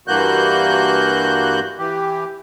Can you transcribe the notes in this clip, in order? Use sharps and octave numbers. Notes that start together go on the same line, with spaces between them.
G2 E3 A#3 F#4 F#6 G6
E3 G4